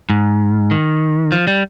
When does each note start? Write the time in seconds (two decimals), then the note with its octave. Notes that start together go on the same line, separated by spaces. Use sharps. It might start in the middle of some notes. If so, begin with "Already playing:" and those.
0.10 G#2
0.71 D#3
1.32 F3
1.47 G3